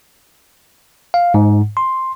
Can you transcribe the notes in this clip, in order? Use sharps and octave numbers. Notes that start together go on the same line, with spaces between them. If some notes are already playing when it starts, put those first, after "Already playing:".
F5
G#2
C6